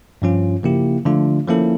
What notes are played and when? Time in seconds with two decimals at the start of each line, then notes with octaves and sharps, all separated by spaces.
0.22 G2 F3 C#4 F4
0.64 C#3 F3 A#3 E4 G4
1.05 D3 F3 A3 D4 F4
1.47 F3 A#3 C#4 E4 A4